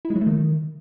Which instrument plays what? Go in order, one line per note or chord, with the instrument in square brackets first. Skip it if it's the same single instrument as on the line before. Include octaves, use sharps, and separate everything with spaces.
[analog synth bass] E4
G#3
F#3
A3
D#3